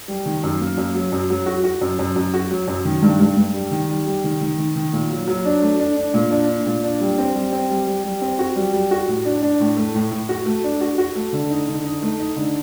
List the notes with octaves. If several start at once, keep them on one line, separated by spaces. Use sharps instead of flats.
G3
D#3
F#2
A#3
F#2
F#3
F#2
F#3
F#4
F#4
F#2
F#2
F#2
F#4
F#3
F#2
D#3
G2
G2
G2
G3
D#3
G3
G3
D#3
D#3
D#3
D#3
A#2
F#3
F#3
D4
A3
D4
D4
A#2
D4
D4
A#2
D4
G3
C4
G3
C4
G3
G3
G3
C4
F#4
G3
G3
F#4
A2
D4
D4
A2
A3
A2
A2
F#4
A3
D4
F#4
F#4
A3
D3
D#4
D3
D#4
A3
D#4
D3